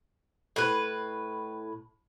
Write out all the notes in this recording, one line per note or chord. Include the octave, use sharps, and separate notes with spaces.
A2 B4